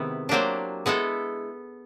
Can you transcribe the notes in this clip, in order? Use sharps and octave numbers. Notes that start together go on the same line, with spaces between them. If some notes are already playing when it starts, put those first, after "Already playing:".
Already playing: C3 D#3 G#3 B3 E4
F#3 A#3 D4 G4 C5
G#3 B3 E4 A4